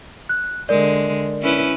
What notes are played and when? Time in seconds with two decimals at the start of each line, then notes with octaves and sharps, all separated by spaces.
0.29 F#6
0.69 D3 G#3 A#4 D5
1.42 C#4 E4 B4